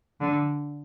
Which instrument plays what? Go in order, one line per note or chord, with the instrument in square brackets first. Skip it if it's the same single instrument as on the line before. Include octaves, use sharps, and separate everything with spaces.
[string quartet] D3